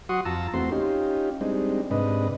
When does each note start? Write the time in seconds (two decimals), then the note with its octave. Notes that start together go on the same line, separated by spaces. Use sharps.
0.09 F#3 F#4 F#5 C6 C#6 D#6
0.25 F2 F4 A5 A#5 E6
0.54 E2 A3 C4 F#4 C6
0.71 C#4 D#4 F4 G4
1.41 G3 G#3 C4 D4 D#4
1.91 G#2 C3 D4 B4 D#5